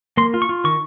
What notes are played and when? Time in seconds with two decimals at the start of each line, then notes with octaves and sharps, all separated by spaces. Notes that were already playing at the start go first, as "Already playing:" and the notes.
0.17 A#3 C6
0.34 F4
0.42 C#6
0.49 F4
0.64 D#3 C#6